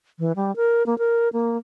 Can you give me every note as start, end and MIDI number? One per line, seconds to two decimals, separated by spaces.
0.19 0.32 52
0.36 0.55 55
0.56 0.85 70
0.86 0.98 58
0.98 1.29 70
1.33 1.57 58